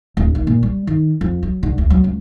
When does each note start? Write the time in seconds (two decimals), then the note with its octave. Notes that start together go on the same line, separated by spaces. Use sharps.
0.17 D1
0.35 D#3
0.47 A#2
0.63 G3
0.87 D#3
1.21 F2
1.43 F#3
1.63 D3
1.78 D2
1.90 F#3
2.04 C#2